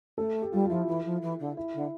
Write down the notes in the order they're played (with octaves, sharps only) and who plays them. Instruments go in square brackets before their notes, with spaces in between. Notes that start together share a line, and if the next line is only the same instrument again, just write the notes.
[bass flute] A3 [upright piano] A4
[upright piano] G4
[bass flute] G3 [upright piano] F4
[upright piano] F4
[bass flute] F3 [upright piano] E4
[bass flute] E3
F3
E3
D3
[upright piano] E4
[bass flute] D3